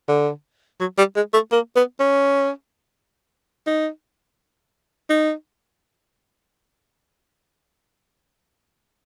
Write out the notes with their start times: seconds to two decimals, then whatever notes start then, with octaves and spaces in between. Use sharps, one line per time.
0.08 D3
0.80 F#3
0.98 G3
1.16 G#3
1.33 A3
1.52 A#3
1.76 B3
2.00 C#4
3.67 D#4
5.10 D#4